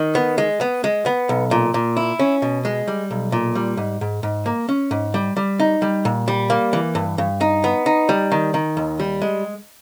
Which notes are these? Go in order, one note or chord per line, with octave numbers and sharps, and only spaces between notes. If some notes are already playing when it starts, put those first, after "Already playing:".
Already playing: D#3
B3
G#3
B3
G#3
B3
B1
A#2
A#2
E4
C#4
B2
G#3
G3
B1
A#2
G3
G#2
G#2
G#2
A#3
C#4
G#2
G3
G3
D#4
G3
A#2
G3
A#3
E3
G2
G2
D#4
B3
D#4
G3
D#3
D#3
D#2
G3
G#3